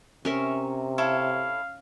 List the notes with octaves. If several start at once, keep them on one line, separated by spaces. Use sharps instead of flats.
C3 C#4 A#4 E5
E4 A4 C#5 F5